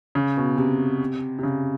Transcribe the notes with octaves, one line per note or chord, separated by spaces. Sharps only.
C#3
B2
C3
C3
C#3